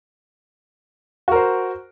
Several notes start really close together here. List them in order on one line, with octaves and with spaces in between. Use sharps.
F#4 A#4 C5